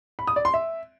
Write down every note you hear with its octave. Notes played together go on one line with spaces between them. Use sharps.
B5
D#6
D5
C6
E5